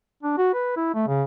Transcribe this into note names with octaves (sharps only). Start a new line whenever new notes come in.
D4
F#4
B4
E4
A3
C#3